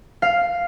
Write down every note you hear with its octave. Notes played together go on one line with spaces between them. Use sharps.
F5